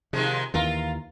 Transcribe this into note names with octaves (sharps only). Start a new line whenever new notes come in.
C3 D#3 F3 G#3
D#2 E3 F4 A#4